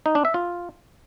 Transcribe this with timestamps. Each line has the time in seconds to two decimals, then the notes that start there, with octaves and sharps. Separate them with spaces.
0.06 D#4
0.15 D4
0.25 E5
0.34 F4